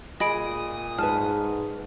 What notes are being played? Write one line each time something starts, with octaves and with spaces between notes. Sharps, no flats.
A#2 G#4 D#5 B5 D#6 D7
G#2 B4 A5 F6 F#6